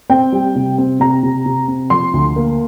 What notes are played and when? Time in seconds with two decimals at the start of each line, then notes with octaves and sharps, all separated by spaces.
0.10 C4 G5
0.32 G3
0.55 C3
0.78 C4
1.00 C3 A#5
1.23 C3
1.46 C3
1.68 C4
1.90 F3 C6
2.14 D2
2.36 A#3